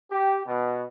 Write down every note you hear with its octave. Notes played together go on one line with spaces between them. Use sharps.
G4
B2